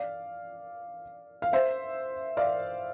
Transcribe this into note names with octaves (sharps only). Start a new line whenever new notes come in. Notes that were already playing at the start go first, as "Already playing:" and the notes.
Already playing: D5 F5
F5
C5 E5
D5 F5